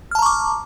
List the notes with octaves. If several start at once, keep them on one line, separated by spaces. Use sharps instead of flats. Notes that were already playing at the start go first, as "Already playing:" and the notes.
A5 A#5 C#6 D6 F6